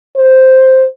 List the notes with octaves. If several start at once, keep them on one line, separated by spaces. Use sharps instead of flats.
C5